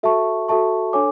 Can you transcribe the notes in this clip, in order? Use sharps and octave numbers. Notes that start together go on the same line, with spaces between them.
F#4 A4 E5 A5 C#6
F#4 A4 E5 A5 C#6
D4 A4 C#5 G#5 D6